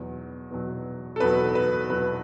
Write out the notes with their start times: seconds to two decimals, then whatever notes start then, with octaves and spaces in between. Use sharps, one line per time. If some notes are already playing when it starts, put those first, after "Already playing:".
Already playing: E2 B2 F#3
0.51 E2 B2 F#3
1.16 A4
1.20 E2 B2 F#3 B4
1.55 B4
1.90 E2 B2 F#3 B4